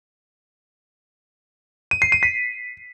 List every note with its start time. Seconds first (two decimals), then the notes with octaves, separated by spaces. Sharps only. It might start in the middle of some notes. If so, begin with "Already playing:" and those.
1.91 D#7
2.02 C7
2.12 D#7
2.23 B6